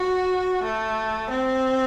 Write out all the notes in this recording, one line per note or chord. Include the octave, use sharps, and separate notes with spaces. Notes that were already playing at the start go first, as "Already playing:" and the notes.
Already playing: F#4
A3
C4